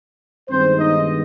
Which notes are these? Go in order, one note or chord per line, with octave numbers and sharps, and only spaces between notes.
G2 D#3 G#3 B3 C4 C5
D#4 D#5